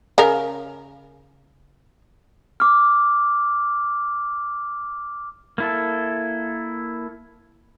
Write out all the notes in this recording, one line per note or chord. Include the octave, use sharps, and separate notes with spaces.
C#3 A#4
D6 F6
A#3 E4 A4